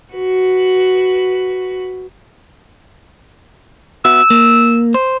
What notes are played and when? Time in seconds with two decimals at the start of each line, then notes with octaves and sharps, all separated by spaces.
0.13 F#4 B4
4.05 B3 F#4 E5 E6
4.30 A#3
4.94 C5